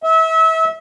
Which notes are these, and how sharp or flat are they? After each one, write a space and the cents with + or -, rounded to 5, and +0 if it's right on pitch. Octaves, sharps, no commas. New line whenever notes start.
E5 -30